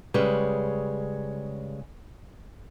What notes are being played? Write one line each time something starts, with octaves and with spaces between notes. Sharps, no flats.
C#3 G3 G#3 C#4 B4